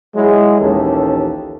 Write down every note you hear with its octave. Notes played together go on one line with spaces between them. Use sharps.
F#3 G#3 E4
A#1 D#2 E3 C#4 G4 A4